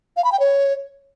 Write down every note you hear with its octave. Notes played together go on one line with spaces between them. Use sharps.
F5
B5
G5
C#5